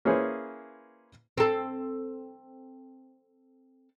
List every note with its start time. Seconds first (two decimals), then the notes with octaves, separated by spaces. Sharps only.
0.05 A#3 C#4 E4 G#4 B4 C5
1.37 C4 A4